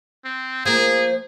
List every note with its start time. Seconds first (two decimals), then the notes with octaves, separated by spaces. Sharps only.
0.25 C4
0.65 F3 A#3 G#4